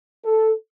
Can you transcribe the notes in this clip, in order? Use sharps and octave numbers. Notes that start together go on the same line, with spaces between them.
A4